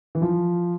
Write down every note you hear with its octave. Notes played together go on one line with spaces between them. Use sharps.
E3
F3